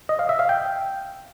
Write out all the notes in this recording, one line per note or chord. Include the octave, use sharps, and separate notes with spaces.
D#5
F5
E5
F5
G5